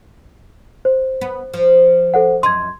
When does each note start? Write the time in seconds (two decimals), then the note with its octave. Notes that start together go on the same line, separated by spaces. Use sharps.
0.85 C5
1.21 B3
1.53 F3
2.14 A4 C5 F#5
2.43 F#2 D#5 C6 G#6